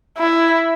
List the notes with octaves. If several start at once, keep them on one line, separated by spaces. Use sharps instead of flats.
E4